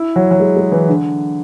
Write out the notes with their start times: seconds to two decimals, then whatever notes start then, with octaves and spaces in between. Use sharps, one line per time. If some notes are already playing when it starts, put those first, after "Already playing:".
Already playing: E4
0.16 F#3
0.31 F#3
0.40 G#3
0.57 G#3
0.72 E3
0.88 D3